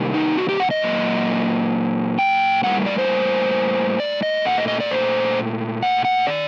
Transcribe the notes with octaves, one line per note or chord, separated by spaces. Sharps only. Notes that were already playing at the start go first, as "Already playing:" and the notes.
Already playing: C3 D#3 G3 A#3
D#4
F#4
G4
F#5
D#5
A#2 F#3 A#3
G5
A2 G3 A#3 F#5
D5
C5
D5
D#5
A#2 A3 F#5
D#5
D#5
D5
C5
F#5
F#5
D#3 D5